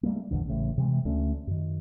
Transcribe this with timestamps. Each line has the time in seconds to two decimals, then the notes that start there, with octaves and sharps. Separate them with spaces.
0.03 G3 A3 A#3
0.31 A#1 E2 D3
0.48 A1 A2 C#3
0.78 C3 E3 G3 G#3
1.05 D2 D3 A3 C#4
1.47 F#2 D#3